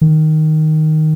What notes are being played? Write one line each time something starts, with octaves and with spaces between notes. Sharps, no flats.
D#3